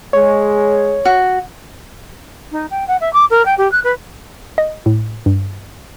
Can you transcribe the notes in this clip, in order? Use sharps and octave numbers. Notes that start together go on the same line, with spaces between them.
G#3 C#5
F#4
D#4
G5
F#5
E5
D6
A#4
G5
G4
F#6
B4
D#5
A2
G2